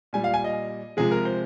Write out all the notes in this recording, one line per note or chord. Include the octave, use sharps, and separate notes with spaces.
A#2 G3 G#5
F5
G#5
D#5
C3 F3 G#3 G#4
A#4
C5